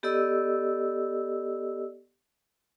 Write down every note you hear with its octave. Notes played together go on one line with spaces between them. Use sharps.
B3 G4 A4 D5 D#5 E6